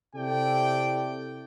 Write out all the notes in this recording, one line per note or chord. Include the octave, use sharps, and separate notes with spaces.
C3 E4 A4 D5 G5